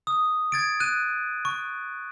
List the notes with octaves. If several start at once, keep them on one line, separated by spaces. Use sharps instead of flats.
D#6
G#6 A6 D7
F#6 D#7
C#6